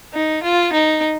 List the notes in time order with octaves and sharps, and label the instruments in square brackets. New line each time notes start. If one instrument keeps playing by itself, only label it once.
[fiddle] D#4
F4
D#4